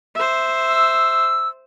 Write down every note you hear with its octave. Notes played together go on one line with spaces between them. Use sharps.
C5 E5
E6